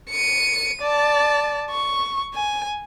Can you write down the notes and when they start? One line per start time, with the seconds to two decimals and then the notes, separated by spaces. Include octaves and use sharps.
0.10 C#7 D#7
0.82 D5 A5
1.71 C#6
2.34 G#5